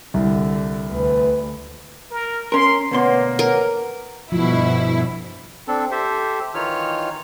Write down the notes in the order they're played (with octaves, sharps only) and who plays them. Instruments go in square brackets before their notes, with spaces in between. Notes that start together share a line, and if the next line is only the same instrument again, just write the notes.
[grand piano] C2 [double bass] D3
[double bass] D2 [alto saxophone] B4
[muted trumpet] A#4
[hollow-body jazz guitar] C#4 A#4 [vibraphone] A#5 [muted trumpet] C6
[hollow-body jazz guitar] D2 B2 C6 [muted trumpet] A#3 [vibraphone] B4 C#5 F#5
[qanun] A#4
[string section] G1 B2 E4 [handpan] F3
[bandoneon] C4 D4 A4
G4 A4 C5 E5
D#3 E3 D#4 F4 C#5 F6